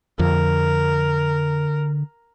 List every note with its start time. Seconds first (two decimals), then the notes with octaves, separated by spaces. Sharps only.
0.19 F2 D3 A#4